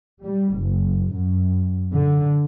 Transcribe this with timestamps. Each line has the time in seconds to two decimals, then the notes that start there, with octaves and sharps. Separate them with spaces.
0.24 G3
0.57 F#1
1.15 F#2
1.93 D3